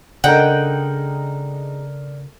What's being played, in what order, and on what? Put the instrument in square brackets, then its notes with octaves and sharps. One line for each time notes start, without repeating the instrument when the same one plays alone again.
[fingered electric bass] C#3 [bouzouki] G#3 D#4 [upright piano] D4 A4 A#4 [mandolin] F#5 G5